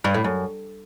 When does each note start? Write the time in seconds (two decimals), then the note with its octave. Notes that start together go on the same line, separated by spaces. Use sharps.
0.04 G2
0.14 A2
0.24 F#2